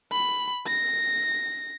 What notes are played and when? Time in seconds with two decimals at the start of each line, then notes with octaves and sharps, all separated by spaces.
0.12 B5
0.67 A#6